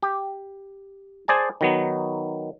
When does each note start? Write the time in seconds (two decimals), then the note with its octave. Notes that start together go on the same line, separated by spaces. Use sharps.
0.02 G4
1.28 G#4 C5 D5 G#5 A5
1.61 D#3 F#3 B3